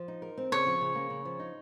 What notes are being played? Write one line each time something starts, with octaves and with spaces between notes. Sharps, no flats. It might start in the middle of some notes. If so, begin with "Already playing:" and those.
Already playing: F3
D#4
A#4
C4
C#3 C#5
F3
C#3
A#3
C#3
F3
D#4